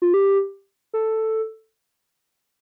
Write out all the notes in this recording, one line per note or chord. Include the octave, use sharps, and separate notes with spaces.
F4
G4
A4